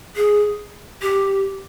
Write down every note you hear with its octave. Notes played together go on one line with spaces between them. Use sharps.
G#4
G4